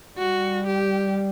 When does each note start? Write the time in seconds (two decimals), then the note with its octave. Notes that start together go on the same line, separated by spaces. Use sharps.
0.17 G3 F#4
0.67 G4